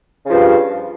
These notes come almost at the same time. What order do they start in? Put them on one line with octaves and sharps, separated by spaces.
C#3 F3 G2